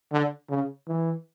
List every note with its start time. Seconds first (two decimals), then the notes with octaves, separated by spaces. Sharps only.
0.12 D3
0.49 C#3
0.88 E3